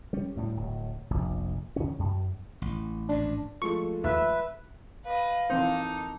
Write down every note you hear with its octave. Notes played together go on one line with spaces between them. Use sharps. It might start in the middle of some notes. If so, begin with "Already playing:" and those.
G3 C#4
D2 A2 G3
D1
F1 A#1
E2 D3 C#4
F#2
A1
A1 D#2 G#2 D4
F3 G#3 A3 C#6
D#2 B4 E5
B4 D#5 F5
E3 A#3 C4 D#4 A4 C5